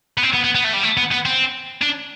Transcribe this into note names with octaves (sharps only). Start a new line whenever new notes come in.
B3
C4
B3
B3
B3
A3
G3
A3
B3
B3
C4
D4